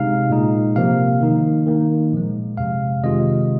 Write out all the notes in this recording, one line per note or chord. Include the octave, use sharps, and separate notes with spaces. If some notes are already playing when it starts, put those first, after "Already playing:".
Already playing: C3 G#3 D#4 F5
A#2 G#3 D#4
C3 F3 A#3 F5
D#3 A#3 D#4
D#3 A#3 D#4
A#2 F3 G#3
F2 C3 G#3 F5
C3 D#3 G#3 F4 D#5